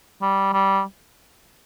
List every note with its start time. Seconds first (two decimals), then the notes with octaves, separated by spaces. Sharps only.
0.22 G3
0.53 G3